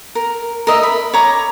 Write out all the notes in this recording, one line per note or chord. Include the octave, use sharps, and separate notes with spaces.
A#4
A#4 D#5 E5
B5
C#5 A#5 D6